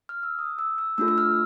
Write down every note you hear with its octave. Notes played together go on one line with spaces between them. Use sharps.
F6
E6
D#6
E6
E6
A3 D4 F4 A4 E6
E6
F6